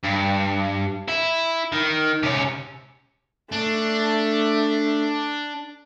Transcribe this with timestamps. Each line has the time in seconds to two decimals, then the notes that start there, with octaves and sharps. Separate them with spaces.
0.04 G2
1.08 E4
1.72 D#3
2.23 C3 C#4
3.52 A3 D4